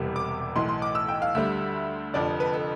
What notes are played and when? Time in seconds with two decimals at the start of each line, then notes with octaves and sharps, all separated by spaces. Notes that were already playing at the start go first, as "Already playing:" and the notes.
Already playing: E1 E2 C3 G3
0.16 D6
0.56 B1 A2 E3 C6
0.69 C6
0.82 D6
0.95 E6
1.08 G5
1.22 F5
1.35 D2 D3 G3 E5
2.14 F1 F2 D3 F3 D5
2.40 B4
2.54 A4